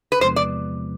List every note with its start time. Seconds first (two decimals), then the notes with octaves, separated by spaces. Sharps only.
0.12 B4
0.20 E2 C3 F3 G#3 B3 C5
0.36 D5